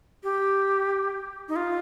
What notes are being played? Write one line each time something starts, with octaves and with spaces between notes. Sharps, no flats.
G4
D#4
F4